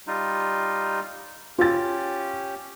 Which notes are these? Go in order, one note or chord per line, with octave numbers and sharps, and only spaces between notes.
G3 D#4 F4
C#4 F4 G4 A6